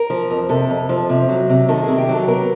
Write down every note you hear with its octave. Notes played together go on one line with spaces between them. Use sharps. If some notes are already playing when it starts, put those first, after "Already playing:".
Already playing: A#4
F3
F2
C3 A4
F2
F3
C3
F#3
C3
D#3 A4
C3 G#4
G4
F#3
A4
B3 A#4